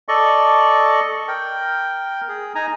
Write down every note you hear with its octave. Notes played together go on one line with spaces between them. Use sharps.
A4 D5 D#5 C#6
A#4 G5
G#4
D#4 G#5 A#5